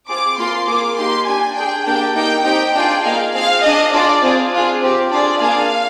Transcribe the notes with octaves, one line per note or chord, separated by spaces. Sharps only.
C4 F4 G#4 D6
A#3 F4 G#4 C6
A#3 F4 G#4 D6
A#3 D#4 G4 C6
D4 G4 G#5
D4 G#4 G5
A#3 D4 G4 G5
A#3 D#4 G4 G5
C4 D#4 G4 G5
D4 F4 G#4 G5
A#3 D#4 G#4 F5
C4 F4 G#4 F5
D4 G#4 D#5
D4 F4 G#4 D5
C4 F4 G#4
D4 F4 G#4
C4 G4
D4 F4 G#4 D5
A#3 D4 G#4 F5